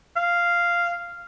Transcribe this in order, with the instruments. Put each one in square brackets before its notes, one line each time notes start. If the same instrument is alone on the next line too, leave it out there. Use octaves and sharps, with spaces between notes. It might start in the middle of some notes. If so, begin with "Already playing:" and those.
[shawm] F5